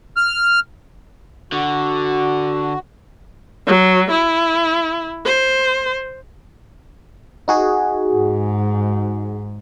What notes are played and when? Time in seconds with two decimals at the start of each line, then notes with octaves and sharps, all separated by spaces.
0.17 F6
1.52 D3 F#4
3.67 F#3
4.11 E4
5.25 C5
7.48 D#4 F#4 G#4
8.13 G#2